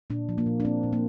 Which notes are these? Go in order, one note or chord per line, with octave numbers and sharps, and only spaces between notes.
A#2 D4
F3
A#3
A#2
D4
A#3 C4
A#2
A#3